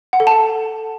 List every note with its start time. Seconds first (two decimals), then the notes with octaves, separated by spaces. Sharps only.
0.13 F#5
0.20 A4
0.27 A5